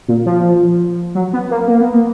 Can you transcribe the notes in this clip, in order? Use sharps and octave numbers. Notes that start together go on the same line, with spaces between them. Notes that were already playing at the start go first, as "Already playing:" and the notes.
A#2
F3
F#3
B3
A#3
A#3
B3
A#3